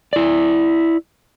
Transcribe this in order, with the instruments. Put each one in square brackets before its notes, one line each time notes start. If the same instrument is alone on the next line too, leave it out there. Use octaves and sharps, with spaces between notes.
[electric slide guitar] E4 D5